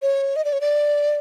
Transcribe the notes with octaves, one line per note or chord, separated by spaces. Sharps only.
C#5
D#5
D5
C#5
D5